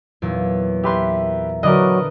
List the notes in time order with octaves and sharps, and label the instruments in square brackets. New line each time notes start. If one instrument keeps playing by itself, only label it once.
[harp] E2 A#2 F#3
[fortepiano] G4 B4 C6 [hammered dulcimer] A#4 E5
[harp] D3 [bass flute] F#3 [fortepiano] A#4 D5 D#5 [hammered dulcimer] B4